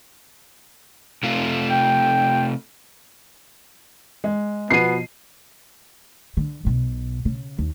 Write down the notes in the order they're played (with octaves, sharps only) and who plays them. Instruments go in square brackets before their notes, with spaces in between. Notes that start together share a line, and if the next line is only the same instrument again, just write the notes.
[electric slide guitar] C3 A3 F4
[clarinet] G5
[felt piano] G#3
[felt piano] B2 F3 D#7 [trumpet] B3 [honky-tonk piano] C7
[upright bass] D3
B1 B2
C#3
D#2